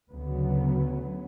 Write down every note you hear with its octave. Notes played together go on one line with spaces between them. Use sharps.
D2 C#3 F#3 B3